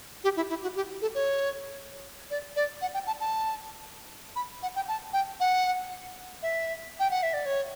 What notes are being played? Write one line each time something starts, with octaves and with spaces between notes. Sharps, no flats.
G4
E4
E4
F#4
G4
A4
C#5
D5
D5
F#5
G5
A5
A5
B5
F#5
G5
A5
G5
F#5
E5
G5
F#5
E5
D5
C#5